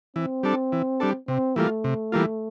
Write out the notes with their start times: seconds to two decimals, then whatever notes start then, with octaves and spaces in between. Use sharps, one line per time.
0.16 E3 C4
0.43 G3 D4 A4
0.72 E3
1.00 G3 D4 A4
1.28 C3 C4
1.56 E3 G3 A3 A#3 F4
1.84 C3
2.12 E3 G3 A#3 F4